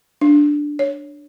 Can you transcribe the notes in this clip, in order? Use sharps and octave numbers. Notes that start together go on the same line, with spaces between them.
D4
C#5